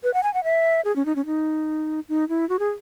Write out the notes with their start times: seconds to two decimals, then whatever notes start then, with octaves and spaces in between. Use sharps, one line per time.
0.03 B4
0.14 F#5
0.23 G#5
0.34 F#5
0.44 E5
0.85 G#4
0.96 C#4
1.06 D#4
1.16 C#4
1.26 D#4
2.09 D#4
2.29 E4
2.49 F#4
2.59 G#4